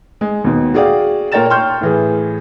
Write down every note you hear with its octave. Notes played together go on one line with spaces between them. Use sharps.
G#3
D#2 B2
F#4 G#4 D5 F5 G5
A#2 A#4 C#5 G5 A6 E7
G5 C6 C#6 F6 G6
A2 E3 G#4